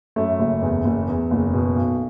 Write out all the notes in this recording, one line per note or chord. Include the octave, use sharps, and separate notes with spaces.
F#2 A3
F#1
E2
F#1
E2
F#1
B2
B1